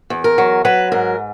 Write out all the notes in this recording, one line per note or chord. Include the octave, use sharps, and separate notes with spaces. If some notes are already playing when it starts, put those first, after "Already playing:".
E2
A#4
F#3
F#3 B4
G#2 A#4